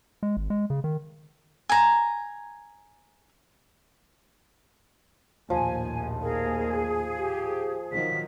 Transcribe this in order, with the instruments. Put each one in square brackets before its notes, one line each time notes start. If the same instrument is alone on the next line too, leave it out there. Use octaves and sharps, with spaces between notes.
[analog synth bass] G#3
G#1
G#3
C#3
D#3
[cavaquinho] G#5 A#5
[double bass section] A#1 D#2 A2 [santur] F3 [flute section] G#5
[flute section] G#4 [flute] A#4
[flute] G4
[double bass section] D#3 F3 F#3 [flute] B6